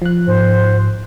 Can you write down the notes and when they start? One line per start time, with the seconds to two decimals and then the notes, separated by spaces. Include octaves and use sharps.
0.02 F3 F#6
0.27 G#2 C5